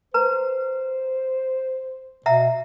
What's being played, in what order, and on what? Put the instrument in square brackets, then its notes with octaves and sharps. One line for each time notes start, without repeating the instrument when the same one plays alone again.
[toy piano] B4 A#5 [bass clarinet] C5
[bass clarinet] B2 [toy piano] E5 F#5 A#5